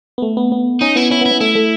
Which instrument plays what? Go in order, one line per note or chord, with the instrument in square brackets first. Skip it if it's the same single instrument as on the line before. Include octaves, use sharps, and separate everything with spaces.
[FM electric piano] B3
A3
B3
B3
[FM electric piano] C#4 [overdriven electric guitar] D#4
[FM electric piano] B3 [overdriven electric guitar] E4
[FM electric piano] C#4 [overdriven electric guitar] E4
[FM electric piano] B3
[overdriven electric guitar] E4
[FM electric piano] B3
[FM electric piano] A3 [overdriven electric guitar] E4
[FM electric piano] A3